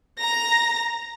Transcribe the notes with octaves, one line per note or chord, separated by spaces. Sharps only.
A#5 A#6